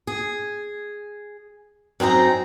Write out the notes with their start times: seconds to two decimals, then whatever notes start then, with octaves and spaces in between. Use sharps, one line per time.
0.07 G#4
2.00 F#2 C4 D#4 A#5